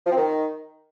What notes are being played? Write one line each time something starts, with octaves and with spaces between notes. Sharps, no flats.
F3
C4
D#3